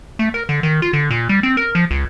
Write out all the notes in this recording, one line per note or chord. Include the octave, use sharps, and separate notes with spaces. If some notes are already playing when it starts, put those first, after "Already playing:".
A3
A#4
D3
D#3
F4
D3
A#2
G3
C4
A#4
F3
C#2